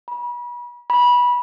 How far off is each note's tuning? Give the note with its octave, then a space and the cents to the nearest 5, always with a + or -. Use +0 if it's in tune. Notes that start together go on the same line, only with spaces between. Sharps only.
B5 -35
B5 -20